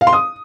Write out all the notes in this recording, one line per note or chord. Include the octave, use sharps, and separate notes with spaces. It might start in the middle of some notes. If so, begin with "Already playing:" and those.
F5
C6
D#6